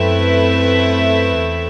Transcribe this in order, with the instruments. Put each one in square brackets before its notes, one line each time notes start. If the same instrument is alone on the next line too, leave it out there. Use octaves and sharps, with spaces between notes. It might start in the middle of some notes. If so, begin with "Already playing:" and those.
Already playing: [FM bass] F#2 [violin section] A3 C4 E4 B4 E5
[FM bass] E2